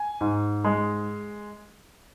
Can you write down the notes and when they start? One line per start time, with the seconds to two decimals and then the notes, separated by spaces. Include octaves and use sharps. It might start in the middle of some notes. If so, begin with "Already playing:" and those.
Already playing: G#5
0.21 G#2
0.64 G#3